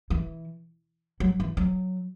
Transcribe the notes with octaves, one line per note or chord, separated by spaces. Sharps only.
E3
F#3
E3
F#3